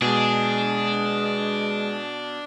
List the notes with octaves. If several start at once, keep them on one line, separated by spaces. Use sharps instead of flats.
B2 G#3 D4 G#4